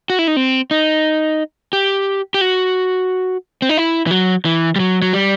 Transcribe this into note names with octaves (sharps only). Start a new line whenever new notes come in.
F#4
E4
D#4
C4
D#4
G4
G4
F#4
C4
D#4
E4
E3
F#3
E3
G3
F#3
F#3
G3